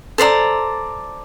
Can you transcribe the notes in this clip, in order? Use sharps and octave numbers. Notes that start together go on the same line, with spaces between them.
A4 C5 D5 A#5